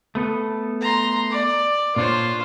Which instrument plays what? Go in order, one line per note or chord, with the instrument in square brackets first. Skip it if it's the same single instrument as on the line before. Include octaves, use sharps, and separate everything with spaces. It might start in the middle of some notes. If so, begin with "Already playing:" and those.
[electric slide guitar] A3 B3 A4
[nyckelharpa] A#5 C6
D5
[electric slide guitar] A#2 D4 C#5 [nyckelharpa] F4 C5